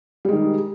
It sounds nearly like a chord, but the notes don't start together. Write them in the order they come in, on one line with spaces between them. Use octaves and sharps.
G3 G#3 D#3